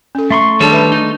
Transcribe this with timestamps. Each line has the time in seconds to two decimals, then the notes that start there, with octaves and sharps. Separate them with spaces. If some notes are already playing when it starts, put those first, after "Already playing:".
0.15 C#4 A4
0.30 A3 E5 A#5 C6 C#6
0.60 D#3 G3 D4 G#4 A4 C#5
0.72 B4 E5 B5
0.92 D#4